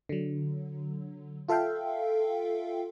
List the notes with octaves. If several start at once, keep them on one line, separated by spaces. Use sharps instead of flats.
D3 F#3
F4 A4 E5 F5 G5